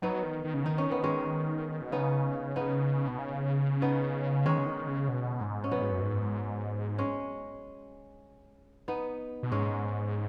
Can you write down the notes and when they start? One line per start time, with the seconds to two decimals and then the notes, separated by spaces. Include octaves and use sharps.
0.02 F#3 B3 D#4
0.23 D#3
0.44 D#3
0.54 C#3
0.64 D#3 D#4
0.78 C#4
0.91 B3
1.04 G#3 C#4
1.81 B2
1.92 C#3 B3 D#4
2.56 B3 D#4
3.08 B2
3.19 C#3
3.82 B3 D#4
4.45 D#3 G#3 C#4
4.58 C#3
4.66 D#3
4.87 C#3
5.08 B2
5.41 G#2
5.64 C#4
5.71 B2 F#3 B3
5.82 G#2
5.92 F#2
6.02 G#2
6.98 G#3 C#4
8.88 B3 D#4
9.43 B2
9.52 G#2 G#3 C#4